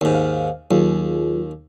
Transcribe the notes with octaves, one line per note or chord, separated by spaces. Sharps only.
D#2 G#2
F5
D#2 F#3 F4 G#4